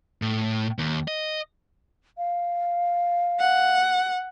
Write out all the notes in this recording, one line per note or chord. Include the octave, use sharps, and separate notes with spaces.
A2
D#2
D#5
F5
F#5